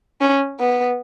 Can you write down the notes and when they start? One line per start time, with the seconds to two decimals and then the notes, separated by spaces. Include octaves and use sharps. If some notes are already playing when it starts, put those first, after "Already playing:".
0.21 C#4
0.60 B3